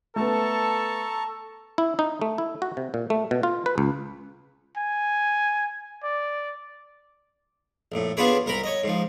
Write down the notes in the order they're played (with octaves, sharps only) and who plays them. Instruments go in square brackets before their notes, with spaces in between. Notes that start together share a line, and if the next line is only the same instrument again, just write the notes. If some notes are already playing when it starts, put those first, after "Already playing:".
[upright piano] A3 B3 [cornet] A4 [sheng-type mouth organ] A5 A#5 C#6
[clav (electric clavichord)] E4
D#4
A3
E4
F#4
C3
A#2
A3
B2
F4
B4
C#2
[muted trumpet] G#5
D5
[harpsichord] A#1 A2
B3 D4 F4 G#4 B4 C#5
C2 A#4 A#5 B5
C#5 D#5
G#2 F3